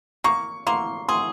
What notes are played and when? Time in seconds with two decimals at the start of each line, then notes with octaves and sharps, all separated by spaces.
0.24 A#3 C#6
0.67 A#3 C6
1.08 G#4 C6